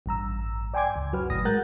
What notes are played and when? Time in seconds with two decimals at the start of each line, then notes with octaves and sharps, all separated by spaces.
0.06 A1 G2 A#5 E6
0.74 D5 G5 G#5 C6 D6 G#6
0.96 C#2
1.13 F#2 F#3 F#4 B4 F6
1.30 G#1 A2 D#6 A#6
1.45 G#3 A#4 F#5 F#6 G6 A6